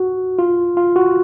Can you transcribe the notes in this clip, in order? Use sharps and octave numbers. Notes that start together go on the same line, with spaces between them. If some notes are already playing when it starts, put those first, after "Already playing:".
Already playing: F#4
F4
F4
F#4